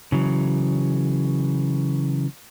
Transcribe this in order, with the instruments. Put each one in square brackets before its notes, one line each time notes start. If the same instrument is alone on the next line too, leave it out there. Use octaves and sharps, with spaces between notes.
[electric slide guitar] C#3 E3 F#3